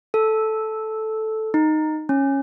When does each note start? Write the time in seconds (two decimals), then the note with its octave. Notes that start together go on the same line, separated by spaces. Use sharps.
0.14 A4
1.54 D#4
2.09 C#4